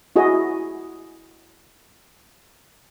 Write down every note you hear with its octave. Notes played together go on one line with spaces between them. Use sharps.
E4 F#4 G#4 D#5